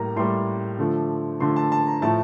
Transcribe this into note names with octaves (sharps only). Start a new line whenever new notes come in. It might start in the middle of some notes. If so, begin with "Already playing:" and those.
Already playing: A2 G3 A#3 A#5
A2 G3 A#3 C6
D3 F3 A3
D3 F3 A3 C6
A5
A5
A#5
A2 F3 A3 A5